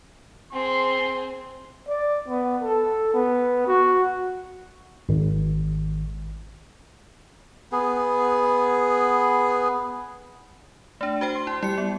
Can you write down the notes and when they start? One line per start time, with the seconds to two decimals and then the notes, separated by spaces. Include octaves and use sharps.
0.52 C4 G#4 C6
1.88 D5
2.28 B3
2.62 A4
3.14 B3
3.67 F#4
5.09 G#1
7.72 B3 G#4
11.01 A3 D4
11.21 F#4 C5 G5
11.35 C6
11.47 E4
11.63 G3 E4 C#7
11.78 B3